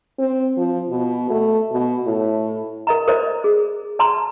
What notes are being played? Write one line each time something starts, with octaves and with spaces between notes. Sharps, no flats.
C4
F3
B2
A3
B2
A2
A#4 D#5 A#5
A#4 C5 D5 D#5
G#4
D5 A5 A#5 C6